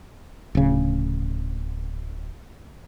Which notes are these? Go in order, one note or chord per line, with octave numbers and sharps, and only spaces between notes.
D1 C#3